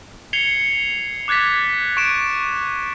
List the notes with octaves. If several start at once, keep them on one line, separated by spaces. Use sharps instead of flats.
G#6 C7 C#7 F7 G7
D6 F#6 G#6 A6 B6
C#6 D7 E7